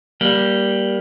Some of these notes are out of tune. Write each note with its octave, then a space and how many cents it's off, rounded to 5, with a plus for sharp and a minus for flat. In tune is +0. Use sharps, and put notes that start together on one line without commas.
G3 +0 A#3 +20